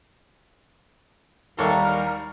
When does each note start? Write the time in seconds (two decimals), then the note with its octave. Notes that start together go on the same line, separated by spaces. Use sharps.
1.59 D#2 G3 A4 A#4 C#5 E5